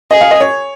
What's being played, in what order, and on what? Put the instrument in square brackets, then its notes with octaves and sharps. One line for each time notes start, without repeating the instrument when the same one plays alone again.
[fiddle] G#4 [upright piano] D#5
[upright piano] F5
D#5
C#5